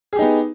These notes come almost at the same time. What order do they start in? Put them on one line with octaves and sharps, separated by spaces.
G#4 G4 D#4 B3